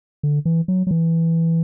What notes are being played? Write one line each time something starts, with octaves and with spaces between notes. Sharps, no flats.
D3
E3
F#3
F#3
E3